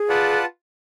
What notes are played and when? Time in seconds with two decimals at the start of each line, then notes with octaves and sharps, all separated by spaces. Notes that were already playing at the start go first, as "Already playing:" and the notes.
Already playing: G#4
0.09 F4 B4 D5 F#5 A5